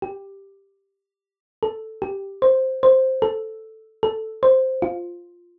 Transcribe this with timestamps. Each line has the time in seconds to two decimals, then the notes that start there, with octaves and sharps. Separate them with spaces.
0.02 G4
1.63 A4
2.02 G4
2.42 C5
2.83 C5
3.22 A4
4.03 A4
4.43 C5
4.82 F4